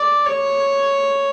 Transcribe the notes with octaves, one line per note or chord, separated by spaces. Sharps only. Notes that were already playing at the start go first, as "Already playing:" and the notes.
Already playing: D5
C#5